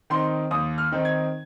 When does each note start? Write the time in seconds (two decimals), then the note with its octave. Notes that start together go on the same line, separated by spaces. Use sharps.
0.10 D#3 C4 D#4 C6
0.51 D#2 D#6
0.78 F6
0.92 D#3 C4 D#4
1.05 G#6